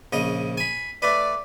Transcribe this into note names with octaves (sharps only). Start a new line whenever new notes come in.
A#1 C#3 D#5
G#5 B5
A3 B4 D5